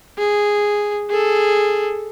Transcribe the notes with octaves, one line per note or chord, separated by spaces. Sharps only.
G#4
G#4 A4